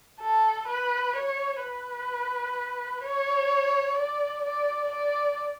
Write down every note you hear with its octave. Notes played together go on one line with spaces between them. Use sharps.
A4
B4
C#5
B4
C#5
D5
D5
D5